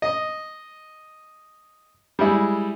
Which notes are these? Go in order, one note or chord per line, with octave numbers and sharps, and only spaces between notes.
D#5
G3 G#3 E4